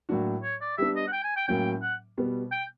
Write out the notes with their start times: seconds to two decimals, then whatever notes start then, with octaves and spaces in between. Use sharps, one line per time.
0.09 A2 F#3 A#3 D4 F#4
0.43 C#5
0.61 D5
0.78 G3 B3 D4 E5
0.96 D#5
1.08 F#5
1.13 G5
1.24 G#5
1.37 G5
1.48 A2 F#3 A#3 C#4 G5
1.82 F#5
2.17 B2 G3 B3
2.52 G5